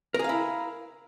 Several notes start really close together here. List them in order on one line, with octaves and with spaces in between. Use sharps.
A#4 G#4 F5 E4